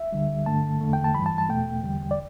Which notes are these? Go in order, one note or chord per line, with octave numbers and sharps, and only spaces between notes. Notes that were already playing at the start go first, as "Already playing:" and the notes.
Already playing: E5
D2 D3 G3
G2 D3 A3 A5
E2 D3 A3
G5
A5
G2 E3 G3 B5
A5
A5
E2 B2 A3 G5
E2 D3 G3
D5